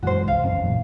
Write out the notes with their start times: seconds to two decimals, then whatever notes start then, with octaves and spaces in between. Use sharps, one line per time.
0.02 F#2 E3 G#3 F#4 C5
0.28 C2 F5
0.45 F2 E3 C#4
0.61 F#2 A#2 E3